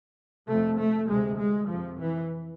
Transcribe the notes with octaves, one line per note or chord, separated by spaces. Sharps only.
F2 C3 A3
A3
D2 C3 G#3
G#3
F2 C3 F3
E3